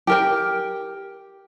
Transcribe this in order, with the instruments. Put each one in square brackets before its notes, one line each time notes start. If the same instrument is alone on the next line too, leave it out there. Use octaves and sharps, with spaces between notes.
[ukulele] G4 A#4 G5